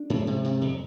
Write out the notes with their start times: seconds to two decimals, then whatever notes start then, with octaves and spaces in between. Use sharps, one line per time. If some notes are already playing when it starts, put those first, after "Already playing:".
Already playing: D4
0.10 G#2
0.27 C3
0.44 C3
0.62 F2